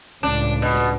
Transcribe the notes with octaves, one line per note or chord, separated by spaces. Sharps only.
C#2 A2 D4
B2